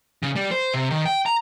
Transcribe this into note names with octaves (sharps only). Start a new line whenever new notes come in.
C#3
G3
C5
C3
D#3
G5
A#5